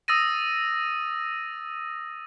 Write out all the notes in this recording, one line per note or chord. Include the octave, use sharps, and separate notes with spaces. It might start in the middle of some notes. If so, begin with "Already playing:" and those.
D#6 E6 A6 A#6 D#7